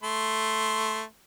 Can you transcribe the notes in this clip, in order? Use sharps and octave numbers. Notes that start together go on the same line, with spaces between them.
A3 C6